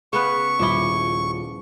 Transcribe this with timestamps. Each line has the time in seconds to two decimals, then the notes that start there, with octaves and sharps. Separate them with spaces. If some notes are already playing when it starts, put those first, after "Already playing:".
0.13 C#3 B3 B4 C#6
0.59 D#1 F3 E4 D6 G7